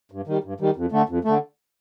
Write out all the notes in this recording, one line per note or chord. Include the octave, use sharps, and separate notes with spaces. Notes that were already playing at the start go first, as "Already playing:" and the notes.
G2
D#3 G3
G2
D#3 G3
F2
D3 A3
F2
D3 A3